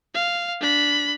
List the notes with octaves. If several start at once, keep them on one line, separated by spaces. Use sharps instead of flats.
F5
D4 B5